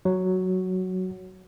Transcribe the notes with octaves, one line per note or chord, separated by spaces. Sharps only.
F#3